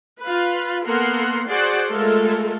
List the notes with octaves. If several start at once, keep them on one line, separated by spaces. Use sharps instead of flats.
F4 B4
A#3 B3 A4 A#4 F#5 C6
F#4 G#4 C5 D5 F#5 C6
G#3 A3 F4 A4 A#4